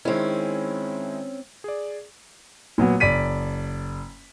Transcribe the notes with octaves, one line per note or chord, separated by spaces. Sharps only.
D#3 G#3 C4 C#4 E4
G#4 D5
A#2 F#3 B3
F#1 D5 B6 D#7